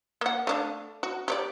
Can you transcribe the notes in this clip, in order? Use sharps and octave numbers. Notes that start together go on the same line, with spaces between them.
A#3 F#5
A3 D4 F5
F#4
G4 C#5 D5